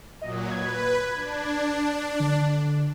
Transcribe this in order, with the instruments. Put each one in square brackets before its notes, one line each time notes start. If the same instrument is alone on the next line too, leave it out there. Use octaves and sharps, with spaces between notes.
[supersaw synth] A#2 F#3 [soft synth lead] D#5
[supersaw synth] B4 [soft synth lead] G#6
[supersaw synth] D4
[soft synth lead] D3